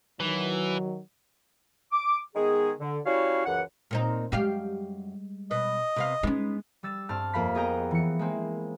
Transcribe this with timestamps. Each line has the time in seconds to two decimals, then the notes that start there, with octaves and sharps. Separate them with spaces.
0.20 D#3 E3 F#3
1.92 D6
2.35 D#3 G#3 B3 G#4
2.79 D3
3.05 G3 C#4 E4 F#4 C#5 F5
3.45 C#2 F#2 E3 F#5
3.91 A#2 C4 D#4
4.32 F#2 G3 G#3 G4 F5
5.51 B2 B4 D#5
5.96 C3 B3 F5
6.23 G#3 B3 C#4 D#4
6.83 G3 E6 A6 E7
7.09 G2 C4 A5 F6
7.34 F2 A#3 A#4 F5 B5 B6
7.55 B3 G#4 D#5 G5 A#5
7.91 E3 C#7
8.19 G#3 A#3 C4